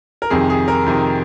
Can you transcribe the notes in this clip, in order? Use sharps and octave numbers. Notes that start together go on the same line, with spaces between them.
A#4
F2 C3 D#3 G#4
G#4
A#4
F2 C3 D#3